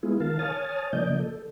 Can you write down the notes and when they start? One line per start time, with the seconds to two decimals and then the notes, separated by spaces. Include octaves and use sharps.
0.03 G#3 B3 E4 F4 G#4
0.20 D#3 A#4 F5 A5
0.39 C#5 G#5 A5 D#6 F6 A6
0.93 C#3 F3 A#3 D5 D#5 G6
1.19 A4